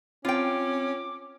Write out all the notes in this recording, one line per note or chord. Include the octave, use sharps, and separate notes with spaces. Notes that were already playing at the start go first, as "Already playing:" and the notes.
C4 C#4 F4 G5 D6